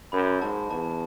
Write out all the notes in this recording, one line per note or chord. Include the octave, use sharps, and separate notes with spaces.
F#2 B5
G#2 A5
E2 A5